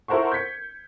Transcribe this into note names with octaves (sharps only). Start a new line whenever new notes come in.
E4 A4 A#4 C5 F#5 C#6
G6 G#6 B6 C#7